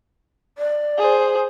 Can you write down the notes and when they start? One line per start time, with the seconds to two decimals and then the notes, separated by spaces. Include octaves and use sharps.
0.58 D5
0.98 G#4 C5